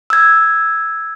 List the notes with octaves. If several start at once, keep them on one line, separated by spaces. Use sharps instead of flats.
E6 G#6